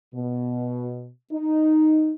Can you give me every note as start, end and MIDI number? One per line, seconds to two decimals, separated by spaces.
0.14 1.09 47
1.31 2.12 63